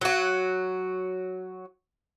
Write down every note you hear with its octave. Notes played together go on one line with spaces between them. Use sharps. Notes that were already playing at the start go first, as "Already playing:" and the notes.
F#3 F#4